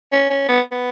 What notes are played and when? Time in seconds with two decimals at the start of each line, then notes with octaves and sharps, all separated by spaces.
0.12 C#4
0.30 C#4
0.48 B3
0.72 B3